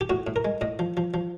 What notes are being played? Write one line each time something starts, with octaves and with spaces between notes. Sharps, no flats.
G4
A2 F#4
A2
A#4
G#3
A2 D#5
F3
F3
F3